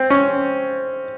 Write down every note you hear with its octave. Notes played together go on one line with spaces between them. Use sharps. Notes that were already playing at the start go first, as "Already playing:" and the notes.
Already playing: C4
C#4